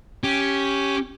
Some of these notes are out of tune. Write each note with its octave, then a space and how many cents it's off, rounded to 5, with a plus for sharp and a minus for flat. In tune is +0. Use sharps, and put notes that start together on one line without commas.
C#4 +0 G4 +0